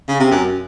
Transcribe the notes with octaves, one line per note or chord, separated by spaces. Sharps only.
C#3
C3
F#2